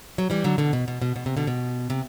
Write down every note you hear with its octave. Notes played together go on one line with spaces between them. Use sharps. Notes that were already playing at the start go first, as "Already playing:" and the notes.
F#3
E3 G3
D3 F#3
B2 D3
B2
B2
B2
B2
C3
B2 D3
B2
C3